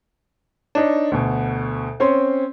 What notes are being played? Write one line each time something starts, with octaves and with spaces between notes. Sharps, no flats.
D4 D#4 C#5
D2 B2
C4 C#4 C#5 C6